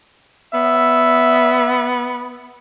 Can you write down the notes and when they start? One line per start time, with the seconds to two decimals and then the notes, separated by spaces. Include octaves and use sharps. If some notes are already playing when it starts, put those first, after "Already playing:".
0.54 B3 E5